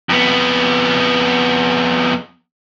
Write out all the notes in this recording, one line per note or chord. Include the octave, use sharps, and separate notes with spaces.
F2 B3